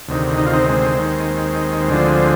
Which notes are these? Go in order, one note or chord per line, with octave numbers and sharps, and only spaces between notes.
D2 C3 D#3
D#4
F4
C4 D#4
G#3 C4
D#2 D#3
D2 D3 F3